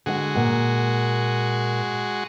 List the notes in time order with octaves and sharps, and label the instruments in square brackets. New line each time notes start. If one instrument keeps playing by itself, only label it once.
[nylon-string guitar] D3 F#5 [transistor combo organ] G#3 F#4
[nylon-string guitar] A#2 F#5